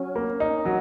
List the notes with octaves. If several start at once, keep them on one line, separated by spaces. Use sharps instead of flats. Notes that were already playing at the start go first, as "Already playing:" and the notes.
Already playing: F#3 C#4
A#3
D#4
F#3